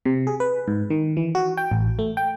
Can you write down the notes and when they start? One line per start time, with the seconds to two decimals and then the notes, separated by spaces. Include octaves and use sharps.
0.06 C3
0.27 G#4
0.40 B4
0.68 G#2
0.90 D#3
1.17 E3
1.35 F#4
1.57 G5
1.71 A1
1.99 A3
2.17 G5